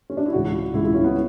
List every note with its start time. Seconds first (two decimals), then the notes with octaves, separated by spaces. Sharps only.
0.10 C#4
0.17 D4
0.26 E4
0.33 C#2 C#3 E3 F#4
0.74 C#2 C#3 E3 E4
0.84 E4
0.94 C#4
1.04 B3